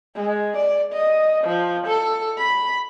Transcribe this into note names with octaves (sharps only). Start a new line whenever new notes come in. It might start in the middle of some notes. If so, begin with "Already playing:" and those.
G#3
D5
D#5
F3
A4
B5